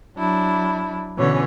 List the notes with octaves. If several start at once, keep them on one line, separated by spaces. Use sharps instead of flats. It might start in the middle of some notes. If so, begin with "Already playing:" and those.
F#3 D4 E4
B2 D3 E3 C#4 C#5